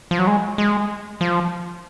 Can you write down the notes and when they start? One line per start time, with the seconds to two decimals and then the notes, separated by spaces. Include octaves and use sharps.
0.11 F3
0.19 F#3
0.27 G#3
0.58 G#3
1.21 F3